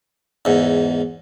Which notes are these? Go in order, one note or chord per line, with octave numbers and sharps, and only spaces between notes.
E2 G#2